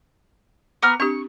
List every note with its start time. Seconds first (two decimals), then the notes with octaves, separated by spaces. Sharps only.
0.83 B3 A#4 D6 F6
1.00 C4 D4 G4 C#6